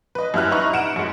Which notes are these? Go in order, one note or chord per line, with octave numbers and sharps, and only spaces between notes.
B4 D#5
F#2 G3 E4 F6 F#6
D#4 B4 E5 A#5 B5 C#6
F#5 D7 E7
F#2 G#3